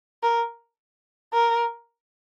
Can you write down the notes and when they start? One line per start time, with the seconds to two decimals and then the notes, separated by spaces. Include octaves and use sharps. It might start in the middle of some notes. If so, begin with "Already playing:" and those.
0.23 A#4
1.33 A#4